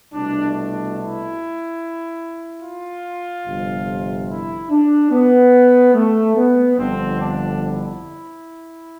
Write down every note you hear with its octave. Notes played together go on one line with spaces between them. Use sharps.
C2 B2 A3 D4
D4
E4
F4
G1 F2 C3
E4
D4
B3
A3
B3
G1 F2 D3 F3 C4
D4
E4